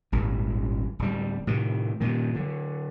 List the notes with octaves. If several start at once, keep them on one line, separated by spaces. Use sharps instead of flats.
D#1 G#1 G2
D1 G3
A2 C3 D#3
G2 A#2 D#3
D3 F#3